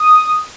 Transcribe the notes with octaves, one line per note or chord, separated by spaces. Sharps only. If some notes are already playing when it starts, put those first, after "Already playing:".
Already playing: D#6